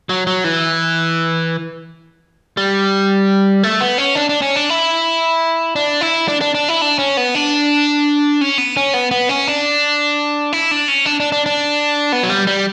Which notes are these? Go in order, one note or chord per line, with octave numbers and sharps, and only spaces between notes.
F#3
F#3
E3
G3
A3
B3
C#4
D4
D4
C#4
D4
E4
D4
E4
D4
D4
D4
E4
D4
C#4
B3
D4
C#4
B3
C#4
B3
B3
C#4
D4
E4
D4
C#4
D4
D4
D4
D4
B3
F#3
G3
G3